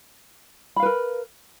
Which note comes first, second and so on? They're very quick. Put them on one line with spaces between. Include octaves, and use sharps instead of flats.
B5 F5 B4 A#4